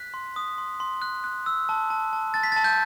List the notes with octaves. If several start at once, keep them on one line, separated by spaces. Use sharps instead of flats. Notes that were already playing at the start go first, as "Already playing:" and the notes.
Already playing: F#6 B6
C6
D#6
C6
C6
F#6
F#6
E6
A5
A5
A5
A5 A6
B6
A6
A5
G6